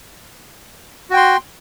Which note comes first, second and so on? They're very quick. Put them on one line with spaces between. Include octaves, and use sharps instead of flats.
F#4 G5 C6